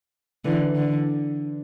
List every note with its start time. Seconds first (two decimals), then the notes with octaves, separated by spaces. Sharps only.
0.45 D3 E3
0.75 D3